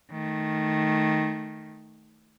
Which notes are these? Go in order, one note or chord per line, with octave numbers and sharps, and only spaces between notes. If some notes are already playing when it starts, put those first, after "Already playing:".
D#3 A3